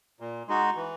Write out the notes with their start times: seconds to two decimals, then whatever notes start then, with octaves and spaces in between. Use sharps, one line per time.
0.20 A#2
0.48 G#3 D#4 F#4
0.76 E3